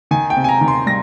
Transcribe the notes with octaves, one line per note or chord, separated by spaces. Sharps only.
D#3 G#5
G5
C3
G#5
A#5
D#3
C6
G3 A#6